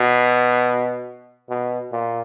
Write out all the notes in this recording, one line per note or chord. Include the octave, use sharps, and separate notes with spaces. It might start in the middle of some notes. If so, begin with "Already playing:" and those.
Already playing: B2
B2
A#2